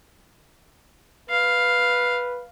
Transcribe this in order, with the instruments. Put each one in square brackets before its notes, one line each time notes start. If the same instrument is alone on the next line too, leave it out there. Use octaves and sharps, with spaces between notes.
[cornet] B4 [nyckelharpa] F5